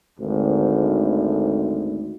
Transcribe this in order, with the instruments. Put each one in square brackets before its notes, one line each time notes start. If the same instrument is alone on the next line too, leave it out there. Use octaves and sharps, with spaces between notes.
[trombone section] G#1 D2